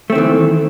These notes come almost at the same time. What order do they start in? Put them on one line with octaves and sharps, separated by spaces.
A3 C4 D#3 E3